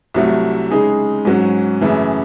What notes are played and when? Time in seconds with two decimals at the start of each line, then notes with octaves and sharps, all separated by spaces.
0.14 C2 C3 F#3 A3
0.71 C#3 G#3 D#4 G#4
1.25 G#2 F#3 C#4
1.81 F#2 C#3 E3 A3